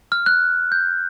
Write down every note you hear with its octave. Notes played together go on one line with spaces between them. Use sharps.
F6
F#6
G6